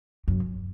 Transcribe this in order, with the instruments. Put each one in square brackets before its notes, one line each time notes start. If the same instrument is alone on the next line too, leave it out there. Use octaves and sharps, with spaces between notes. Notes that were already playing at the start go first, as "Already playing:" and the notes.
[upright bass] F#2